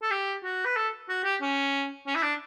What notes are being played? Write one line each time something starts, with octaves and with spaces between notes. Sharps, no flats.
A4
G4
F#4
B4
A4
F#4
G4
C#4
C#4
E4
D4